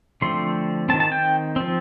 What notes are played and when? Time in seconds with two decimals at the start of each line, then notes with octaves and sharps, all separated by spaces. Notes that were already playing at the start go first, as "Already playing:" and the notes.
0.22 D3 F3 A3 C4 C6
0.89 A3 C4 A5
0.94 D#3
1.00 A5
1.12 G5
1.56 F3 C4